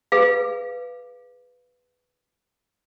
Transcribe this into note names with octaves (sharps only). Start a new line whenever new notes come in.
G#4 B4 F5